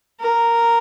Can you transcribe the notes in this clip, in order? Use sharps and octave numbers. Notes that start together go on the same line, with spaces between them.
A#4